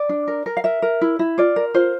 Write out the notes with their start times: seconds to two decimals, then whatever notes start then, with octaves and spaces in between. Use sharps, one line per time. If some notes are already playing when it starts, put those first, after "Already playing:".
Already playing: D5
0.09 D4
0.28 A#4
0.46 A#4
0.57 F5
0.64 A#4 E5
0.82 A#4
1.01 E4
1.19 E4
1.38 F4 D5
1.56 A#4
1.74 F4 C5